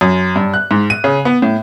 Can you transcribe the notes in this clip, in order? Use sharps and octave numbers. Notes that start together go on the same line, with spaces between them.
F#2
G2
F#6
G#2
D#7
C#3
B3
A2